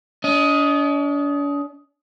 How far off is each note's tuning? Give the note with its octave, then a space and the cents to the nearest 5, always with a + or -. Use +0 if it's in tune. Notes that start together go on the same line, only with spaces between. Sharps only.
D4 -45 D#5 +10